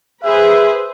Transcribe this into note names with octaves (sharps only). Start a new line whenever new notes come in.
G#4 B4 C5 E5